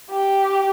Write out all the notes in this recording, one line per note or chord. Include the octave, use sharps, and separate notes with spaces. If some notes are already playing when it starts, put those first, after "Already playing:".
G4